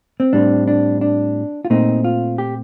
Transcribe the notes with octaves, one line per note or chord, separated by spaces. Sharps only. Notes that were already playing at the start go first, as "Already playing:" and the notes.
C4
A2 G3 C4 D4
D4
D4
F4
A#2 A3 C4 D#4
F4
G4